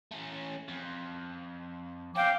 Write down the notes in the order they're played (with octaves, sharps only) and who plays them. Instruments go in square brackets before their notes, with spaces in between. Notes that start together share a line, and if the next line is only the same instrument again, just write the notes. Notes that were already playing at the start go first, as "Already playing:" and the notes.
[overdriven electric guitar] A3 C#4
F2
[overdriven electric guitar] C4 C#4 [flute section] F5 G5 D6